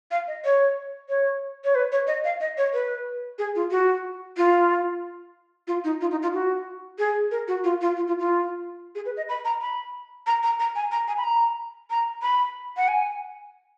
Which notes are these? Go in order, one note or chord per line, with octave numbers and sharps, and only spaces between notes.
F5
D#5
C#5
C#5
C#5
B4
C#5
D#5
F5
D#5
C#5
B4
G#4
F4
F#4
F4
F4
D#4
F4
D#4
F4
F#4
G#4
A#4
F#4
F4
F4
F4
F4
F4
G#4
B4
D#5
B5
A#5
B5
A#5
A#5
A#5
G#5
A#5
G#5
B5
A#5
A#5
B5
F#5
G#5